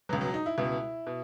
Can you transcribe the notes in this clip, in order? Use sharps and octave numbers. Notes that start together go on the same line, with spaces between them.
C#2 B2 F#3
F#3
D#4
E4
C#2 B2 E4
B2